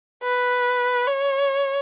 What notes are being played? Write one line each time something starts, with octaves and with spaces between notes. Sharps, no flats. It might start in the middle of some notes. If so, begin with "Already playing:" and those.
B4
C#5